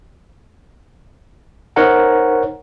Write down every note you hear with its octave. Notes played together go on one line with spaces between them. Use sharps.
D#4 A#4 C5 C#5 F#5 A#5